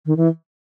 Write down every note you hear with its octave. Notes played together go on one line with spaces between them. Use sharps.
D#3
E3